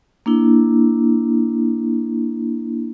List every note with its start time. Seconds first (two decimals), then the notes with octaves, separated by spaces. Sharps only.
0.26 A#3 D4 E4